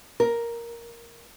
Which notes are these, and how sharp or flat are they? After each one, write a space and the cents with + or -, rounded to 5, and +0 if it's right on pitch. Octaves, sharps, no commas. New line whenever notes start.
A#4 +5